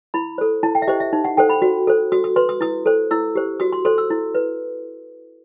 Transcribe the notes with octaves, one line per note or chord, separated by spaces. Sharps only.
E4 B5
A4 C5
E4 A5
G5
E5
G4 C5 D#5
E5
D#4
F#5
A4 C5 G5
B5
F#4
A4 C5
F#4 D#6
D#6
B4 C6
D#6
E4 D#6
A4 C5
E4 E6
G4 C5
F#4 D#6
C6
A4 C5 C6
E6
E4
B4